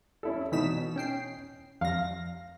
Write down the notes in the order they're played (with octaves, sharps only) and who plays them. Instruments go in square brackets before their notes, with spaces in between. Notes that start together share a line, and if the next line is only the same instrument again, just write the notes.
[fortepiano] C#4 E4 A4
[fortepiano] B2 D#4 [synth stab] E3 B6 E7
[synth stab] C#4 G5 C7
[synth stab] F2 A#6 [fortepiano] F5